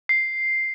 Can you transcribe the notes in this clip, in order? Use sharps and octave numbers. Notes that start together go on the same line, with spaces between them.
C7